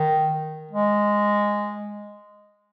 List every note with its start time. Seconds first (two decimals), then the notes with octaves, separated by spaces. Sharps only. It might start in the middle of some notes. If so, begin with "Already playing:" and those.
Already playing: D#3
0.71 G#3